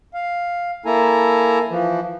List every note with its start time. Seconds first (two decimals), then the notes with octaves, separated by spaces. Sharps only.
0.14 F5
0.85 A#3 E4 A4 G#5 A#5
1.69 E3 F3